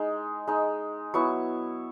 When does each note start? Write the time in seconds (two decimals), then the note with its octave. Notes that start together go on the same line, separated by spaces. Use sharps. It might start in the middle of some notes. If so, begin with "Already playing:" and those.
Already playing: G#3 D#4
0.47 G#3 D#4
1.14 F#3 B3 E4 C#6